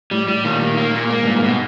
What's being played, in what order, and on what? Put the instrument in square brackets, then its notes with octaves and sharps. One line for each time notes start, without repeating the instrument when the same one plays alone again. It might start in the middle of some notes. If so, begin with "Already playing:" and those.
[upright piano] A2 [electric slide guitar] G3
[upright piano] A2 [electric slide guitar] G3
[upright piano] A#2 [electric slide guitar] D#3
[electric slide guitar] D#3
A#3
A#2
[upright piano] G#2 [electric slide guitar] A#3
[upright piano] G2 [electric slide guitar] A#2
[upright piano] G#2
[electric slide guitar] B2